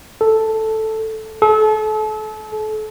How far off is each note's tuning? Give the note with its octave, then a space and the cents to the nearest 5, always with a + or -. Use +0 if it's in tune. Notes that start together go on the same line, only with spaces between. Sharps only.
A4 +0
A4 -35